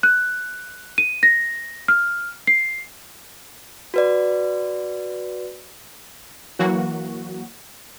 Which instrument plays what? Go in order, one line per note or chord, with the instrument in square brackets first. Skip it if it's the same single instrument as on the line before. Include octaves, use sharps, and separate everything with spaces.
[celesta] F#6
D#7
A#6
F6
C7
[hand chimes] F#4 B4 D5
[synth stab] E3 F#3 A#3 F#4